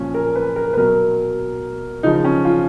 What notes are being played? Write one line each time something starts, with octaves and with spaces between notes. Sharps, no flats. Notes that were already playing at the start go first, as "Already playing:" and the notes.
Already playing: A#2 F3 C#4
A#4
B4
A#4
B4
B2 F#3 A#4
C#3 F3 D#4
C#4
F4